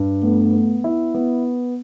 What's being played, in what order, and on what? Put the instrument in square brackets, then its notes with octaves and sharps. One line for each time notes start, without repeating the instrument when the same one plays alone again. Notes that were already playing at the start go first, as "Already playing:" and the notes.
Already playing: [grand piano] G2
[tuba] A3 [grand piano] B3
[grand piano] B3
E4
B3